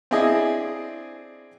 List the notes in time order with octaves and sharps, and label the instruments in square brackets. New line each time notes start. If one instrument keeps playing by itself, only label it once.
[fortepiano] C4 D4 E4 G#4 D#5